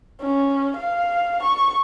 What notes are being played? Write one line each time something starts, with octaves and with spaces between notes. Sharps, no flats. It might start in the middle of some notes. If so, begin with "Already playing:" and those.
C#4
F5
C#6